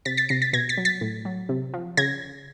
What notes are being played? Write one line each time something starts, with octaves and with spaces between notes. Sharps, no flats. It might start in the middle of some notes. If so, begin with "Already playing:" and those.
C3 A6 B6
A6 B6
C3 A#6 C7
A6 B6
B2 G#6 A#6
A6 B6
F#3
A6 B6
A2
F#3
C3
F3
C#3 G#6 A#6